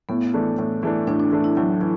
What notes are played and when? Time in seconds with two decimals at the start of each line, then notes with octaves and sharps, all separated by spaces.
0.09 A2 B3
0.34 E3 A3 D4
0.58 A2
0.83 E3 A3 D4
1.07 A2 D4
1.20 D4
1.32 E3 A3 D4
1.44 E4
1.57 A2 F#3
1.81 E3